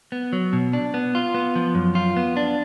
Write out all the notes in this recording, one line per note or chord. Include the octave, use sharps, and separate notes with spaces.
B3
F#3
B2
D4
B3
F4
B3
F3
F#2
F4
B3
D4